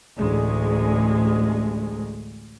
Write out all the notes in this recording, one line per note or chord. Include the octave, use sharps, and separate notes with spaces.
A1 D2 G#3